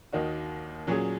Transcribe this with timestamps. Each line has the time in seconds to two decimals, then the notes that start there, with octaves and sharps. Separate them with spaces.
0.12 D#2 D#3 A#3 D#4 F#4
0.87 A#2 F#3 C#4 G#4